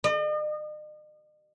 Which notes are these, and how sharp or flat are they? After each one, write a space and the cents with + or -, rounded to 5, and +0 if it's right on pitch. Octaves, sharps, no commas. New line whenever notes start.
D#5 -45